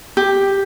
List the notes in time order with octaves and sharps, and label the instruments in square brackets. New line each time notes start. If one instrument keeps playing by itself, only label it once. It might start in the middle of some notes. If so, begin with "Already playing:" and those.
[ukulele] G4